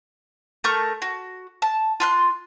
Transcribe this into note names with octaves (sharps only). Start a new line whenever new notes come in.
A3 A#4 C#6 G6
F#4
A5
F4 C6 F#6